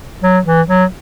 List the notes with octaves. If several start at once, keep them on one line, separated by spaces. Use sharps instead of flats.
F#3
E3
F#3